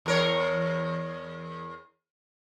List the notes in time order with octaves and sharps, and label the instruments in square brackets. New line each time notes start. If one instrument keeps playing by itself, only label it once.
[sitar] E2 A#4 C#5